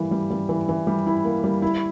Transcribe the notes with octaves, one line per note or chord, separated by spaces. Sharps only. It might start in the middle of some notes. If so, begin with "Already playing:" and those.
Already playing: E3 G3 A#3
G3
G3
E3
E3
G3
E4
A#3
G3
E4